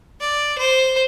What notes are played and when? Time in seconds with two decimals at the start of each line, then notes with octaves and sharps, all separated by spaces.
0.20 D5
0.58 C5